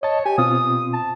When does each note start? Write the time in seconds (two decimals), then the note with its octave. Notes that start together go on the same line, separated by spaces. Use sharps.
0.03 C#5 D#5 A5
0.26 G4 G#5
0.38 B2 C4 F4 D#6
0.93 A5